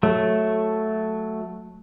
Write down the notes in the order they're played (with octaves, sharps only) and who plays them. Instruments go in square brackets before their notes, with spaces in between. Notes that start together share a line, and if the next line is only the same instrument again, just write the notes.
[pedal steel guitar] F#3 A3